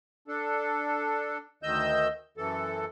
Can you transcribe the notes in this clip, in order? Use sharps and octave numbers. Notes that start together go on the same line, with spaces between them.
D4 A4
D2 D#3 D#5 E6 G6
F#2 E3 A4